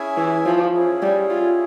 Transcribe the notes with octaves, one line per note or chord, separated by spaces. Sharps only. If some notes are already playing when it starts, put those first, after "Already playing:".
Already playing: C#4 E4 G#4 E5 G#5
E3
F3
C#4 E4 G#4
G3
F4